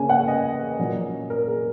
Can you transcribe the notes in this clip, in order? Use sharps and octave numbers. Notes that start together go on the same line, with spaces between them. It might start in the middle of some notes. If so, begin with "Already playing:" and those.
Already playing: C#3 A#3 C#4 G#5
F#5
D#5
A#2 F#3 C#4
A#4
G#4